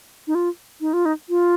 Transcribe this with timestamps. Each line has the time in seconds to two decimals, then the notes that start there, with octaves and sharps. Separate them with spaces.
0.27 D#4
0.35 F4
0.81 D#4
0.93 F4
1.05 D#4
1.29 F4